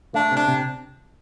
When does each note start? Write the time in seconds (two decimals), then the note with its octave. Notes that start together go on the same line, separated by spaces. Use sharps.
0.14 A3 D4
0.32 C3
0.37 D4
0.48 C3